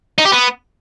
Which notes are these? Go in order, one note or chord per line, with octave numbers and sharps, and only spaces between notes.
D#4
G4
B3